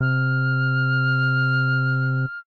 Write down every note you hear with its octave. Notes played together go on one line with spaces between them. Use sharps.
C3 F6